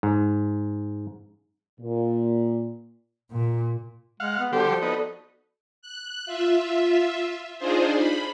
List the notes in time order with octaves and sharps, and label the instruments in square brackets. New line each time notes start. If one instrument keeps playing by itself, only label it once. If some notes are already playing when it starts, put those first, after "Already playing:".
[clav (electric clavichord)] G#2
[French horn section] A#2
[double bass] A#2
[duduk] G#3 [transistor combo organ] F5 F#5
[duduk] B3
[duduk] D3 [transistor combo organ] G3 G4 C5 [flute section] F#4 A4 D5
[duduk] F3
[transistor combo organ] B3 D#4
[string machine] F#6
F4 E5
D4 D#4 F4 G#4 C5
B5